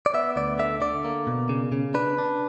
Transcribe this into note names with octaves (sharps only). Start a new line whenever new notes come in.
D5
B3 E5
D2 D5
D3 E5
D3 D5
A#3
B2
C#3
C#3
D4 B4
D4